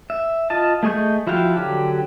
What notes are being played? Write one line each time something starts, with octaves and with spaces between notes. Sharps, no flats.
E5
F4 D#5 A5
A3 G#4 D#5 C#6 G6
F3 E4 F#4 F5 G5
D3 F#3 G4